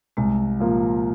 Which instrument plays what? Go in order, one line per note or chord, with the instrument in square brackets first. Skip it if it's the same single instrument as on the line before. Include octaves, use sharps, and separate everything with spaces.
[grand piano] C2 [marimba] G#3
[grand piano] A#2 F3 A#3